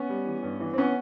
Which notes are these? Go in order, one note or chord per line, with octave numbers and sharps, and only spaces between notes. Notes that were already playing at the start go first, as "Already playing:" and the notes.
Already playing: B3 C#4
G3
E3
G2
E3
C4
B3 C#4